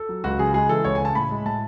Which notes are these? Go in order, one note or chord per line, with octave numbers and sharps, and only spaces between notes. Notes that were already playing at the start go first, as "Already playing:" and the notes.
Already playing: A4
F#3
C#2 F#4
C#3 G#4
G#3 G#4
E3 A4
C#2 C#5
G#5
C#3 A5
A2 B5
G#3
A2 A5